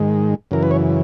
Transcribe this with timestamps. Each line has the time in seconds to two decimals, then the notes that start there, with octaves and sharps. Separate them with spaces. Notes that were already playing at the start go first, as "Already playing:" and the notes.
Already playing: G#2 D#3 G#3
0.51 F#2 C#3 E3 A#4
0.63 B4
0.71 C#5